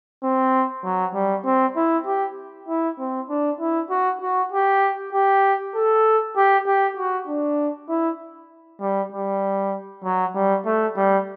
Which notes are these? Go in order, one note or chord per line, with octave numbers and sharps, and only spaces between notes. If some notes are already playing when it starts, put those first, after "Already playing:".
C4
F#3
G3
C4
E4
G4
E4
C4
D4
E4
F#4
F#4
G4
G4
A4
G4
G4
F#4
D4
E4
G3
G3
F#3
G3
A3
G3